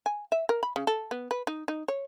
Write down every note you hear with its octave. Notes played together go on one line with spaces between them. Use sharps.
G#5
E5
A#4
B5
C#3
A4
B3
B4
D#4
D#4
C#5